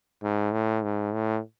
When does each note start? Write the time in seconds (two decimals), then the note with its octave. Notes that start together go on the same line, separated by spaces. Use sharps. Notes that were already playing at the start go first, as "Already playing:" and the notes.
0.23 G#2
0.52 A2
0.83 G#2
1.14 A2